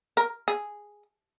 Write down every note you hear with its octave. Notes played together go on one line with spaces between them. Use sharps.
A#4
G#4